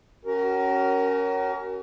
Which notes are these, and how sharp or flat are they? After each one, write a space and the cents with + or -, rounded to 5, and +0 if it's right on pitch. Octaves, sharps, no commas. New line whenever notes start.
C#4 +0 F#4 +40 A#4 +0